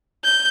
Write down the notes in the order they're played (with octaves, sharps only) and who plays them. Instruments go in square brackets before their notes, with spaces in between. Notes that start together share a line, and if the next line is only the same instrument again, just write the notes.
[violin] G6